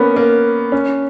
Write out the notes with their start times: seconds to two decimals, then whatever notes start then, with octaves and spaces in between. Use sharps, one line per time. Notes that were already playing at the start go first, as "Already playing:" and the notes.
Already playing: A#3 B3 C#4
0.16 A#3
0.72 C#4